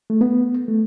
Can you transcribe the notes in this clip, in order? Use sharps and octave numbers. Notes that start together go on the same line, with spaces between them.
A3
B3
A3